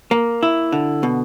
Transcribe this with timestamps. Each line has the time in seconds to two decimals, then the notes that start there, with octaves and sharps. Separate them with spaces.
0.11 A#3
0.43 E4
0.72 D3
1.03 B2